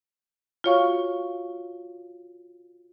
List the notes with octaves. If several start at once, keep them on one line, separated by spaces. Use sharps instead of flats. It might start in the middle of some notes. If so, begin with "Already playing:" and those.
F4 F#4 C#5 F5 C#6